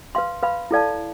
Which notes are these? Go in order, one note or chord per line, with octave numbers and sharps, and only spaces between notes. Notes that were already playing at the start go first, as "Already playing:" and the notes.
B4 F5 C6
B4 F5 B5
E4 A4 D5 F5 A5